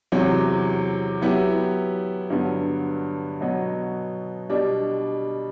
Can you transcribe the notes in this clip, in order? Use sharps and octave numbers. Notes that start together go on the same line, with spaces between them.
E2 C3 F#3
F#3 B3 E4 G4
G2 D3 F#3 B3
B2 F#3 B3
B2 G3 D4